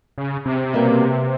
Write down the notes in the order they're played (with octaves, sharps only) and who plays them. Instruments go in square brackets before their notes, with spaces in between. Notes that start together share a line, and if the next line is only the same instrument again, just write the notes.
[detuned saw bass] C#3
C3
[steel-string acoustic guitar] B2 G3 A#3